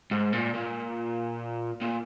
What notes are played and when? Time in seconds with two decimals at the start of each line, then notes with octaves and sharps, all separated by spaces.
0.11 G#2
0.33 A#2
0.54 A#2
1.82 A#2